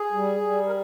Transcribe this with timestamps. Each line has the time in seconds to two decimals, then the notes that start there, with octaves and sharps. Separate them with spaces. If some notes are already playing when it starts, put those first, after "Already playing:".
Already playing: G#4
0.12 G3
0.41 G3
0.66 A#4